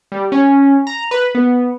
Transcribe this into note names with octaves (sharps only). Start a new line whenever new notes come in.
G3
C#4
A#5
B4
B3